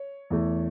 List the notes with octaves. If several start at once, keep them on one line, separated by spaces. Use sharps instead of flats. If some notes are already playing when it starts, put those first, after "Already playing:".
Already playing: C#5
E2 E3 A3